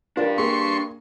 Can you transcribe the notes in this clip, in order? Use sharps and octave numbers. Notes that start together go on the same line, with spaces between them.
D4 F4 G4 A#4 D5
A#3 G#4 C6 C#6